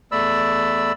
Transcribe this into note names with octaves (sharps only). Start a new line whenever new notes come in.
E2 A3 D5 B5 E6